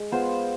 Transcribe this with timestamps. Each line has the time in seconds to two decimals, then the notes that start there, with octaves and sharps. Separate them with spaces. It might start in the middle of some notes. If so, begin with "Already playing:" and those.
Already playing: G#3
0.12 B3 F4 G#4 C5